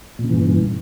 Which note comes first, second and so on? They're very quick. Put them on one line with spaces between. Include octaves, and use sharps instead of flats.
A#2 C#3 E3 G2